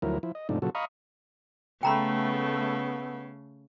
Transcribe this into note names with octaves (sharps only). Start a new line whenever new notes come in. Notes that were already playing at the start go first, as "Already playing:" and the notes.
D2 F3 F#3 E4 A#4
F3 E4
D#5
G#2 C3 F3 A3 D4 D#4
A#2 C#3 F3 F#3 F#4 A4
D#5 F5 A#5 B5 C#6 D#6
C#3 A3 B3 G5 A#5 B5